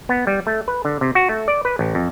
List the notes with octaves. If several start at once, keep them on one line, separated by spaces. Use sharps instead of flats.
B3
G3
A3
B4
D3
C3
F#4
A3
D5
B4
A1
F2